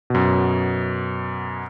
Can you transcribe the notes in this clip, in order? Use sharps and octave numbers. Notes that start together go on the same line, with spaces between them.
F#2 B2